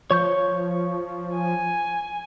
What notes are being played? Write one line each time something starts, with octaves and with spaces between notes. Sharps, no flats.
F3 C#5 C#6 G6
G#5